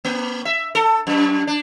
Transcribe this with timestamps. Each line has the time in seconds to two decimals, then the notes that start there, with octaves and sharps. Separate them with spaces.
0.05 A#3
0.45 E5
0.75 A4
1.07 F#2
1.47 D4